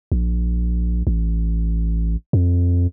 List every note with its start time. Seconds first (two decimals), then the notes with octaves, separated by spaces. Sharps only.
0.12 A#1
1.07 A1
2.33 F2